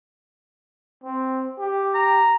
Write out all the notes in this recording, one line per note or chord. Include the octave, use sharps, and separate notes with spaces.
C4
G4
A#5